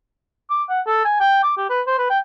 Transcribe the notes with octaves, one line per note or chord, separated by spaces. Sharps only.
D6
F#5
A4
G#5
G5
D6
G4
B4
C5
B4
G5